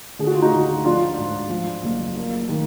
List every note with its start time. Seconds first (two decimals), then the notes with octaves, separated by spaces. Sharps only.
0.19 D3 G#4
0.27 F#4
0.34 F4
0.42 D#4 F#4
0.53 D2
0.84 F3 D4 F4
1.18 G#2
1.50 F3
1.83 F#1
2.16 A#3
2.49 D#3